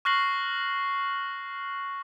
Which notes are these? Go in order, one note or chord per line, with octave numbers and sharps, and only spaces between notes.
C#6 F6 F#6 A#6 C7 F#7